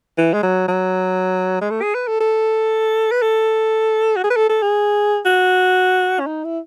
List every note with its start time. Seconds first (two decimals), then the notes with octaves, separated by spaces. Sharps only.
0.18 E3
0.33 G#3
0.42 F#3
0.68 F#3
1.61 G#3
1.70 A3
1.82 G#4
1.94 B4
2.08 A4
2.20 A4
3.11 B4
3.22 A4
4.16 F#4
4.24 G#4
4.30 B4
4.36 A4
4.49 A4
4.62 G#4
5.25 F#4
6.20 C#4
6.26 D#4
6.44 E4